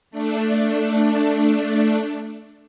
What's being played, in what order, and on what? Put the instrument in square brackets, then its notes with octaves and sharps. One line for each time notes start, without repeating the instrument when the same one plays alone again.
[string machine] A3 D4